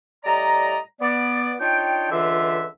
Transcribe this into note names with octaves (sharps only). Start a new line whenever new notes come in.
A2 G3 D5 D#5 A#5
B3 D5
D4 D#4 F4 C#5 G5
C#2 D3 E3 F4 E5